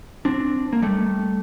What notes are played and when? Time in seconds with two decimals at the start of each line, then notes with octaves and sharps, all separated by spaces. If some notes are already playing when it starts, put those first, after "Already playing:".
0.25 C4 D4
0.73 A#3
0.82 G3 A3